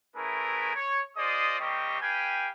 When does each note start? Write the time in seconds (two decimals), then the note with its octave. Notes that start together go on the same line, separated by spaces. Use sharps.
0.16 A3 C#4 E4 G#4 A#4 B4
0.75 C#5
1.17 F4 G#4 C5 D5 D#5 D#6
1.59 G3 A#3 C4 G4 D#5 C#6
2.01 G4 B4 F5 G5 G#5